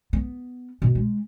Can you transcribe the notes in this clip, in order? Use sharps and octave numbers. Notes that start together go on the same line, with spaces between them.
B3
B2
G#3